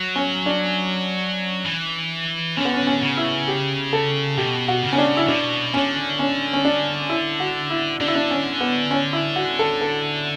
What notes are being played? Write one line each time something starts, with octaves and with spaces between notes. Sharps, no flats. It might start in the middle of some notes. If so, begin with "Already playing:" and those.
Already playing: F#3
C#4
D4
E3
D3 C#4
B3
C#4
C#4
C#3
E4
G4
A4
B2 G4
F#4
C#3
C#4
D4
E4
B2 D4
D3 C#4
C#4
C#4
D4
E4
F#4
E4
D3 D4
E4
D4
C#4
B3
C#4
E4
F#4
A4
A4